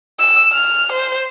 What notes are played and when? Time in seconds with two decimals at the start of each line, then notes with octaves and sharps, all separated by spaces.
0.20 E6
0.53 F6
0.93 C5